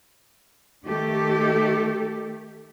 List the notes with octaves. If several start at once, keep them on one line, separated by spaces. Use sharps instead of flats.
D#3 A3 G4 A4